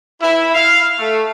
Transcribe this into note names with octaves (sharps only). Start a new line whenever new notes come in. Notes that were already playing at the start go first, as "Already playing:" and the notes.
E4
F5
A3